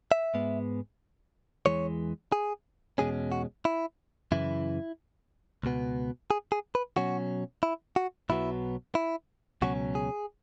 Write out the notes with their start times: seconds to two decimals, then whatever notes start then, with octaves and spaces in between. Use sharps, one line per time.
0.12 E5
0.34 G#2 G#3 B3
1.66 E2 E3 G#3 C#5
2.32 G#4
2.98 E2 B2 G#3 C#4 G#4
3.32 F#4
3.65 E4
4.32 F#2 C#3 E3 E4
5.63 C#2 B2 B3
6.31 G#4
6.52 G#4
6.75 B4
6.97 B2 F#3 C#4 F#4
7.63 E4
7.96 F#4
8.29 B1 B2 F#3 B3 E4
8.95 E4
9.62 C#2 B2 F#3 C#4 F#4
9.95 G#4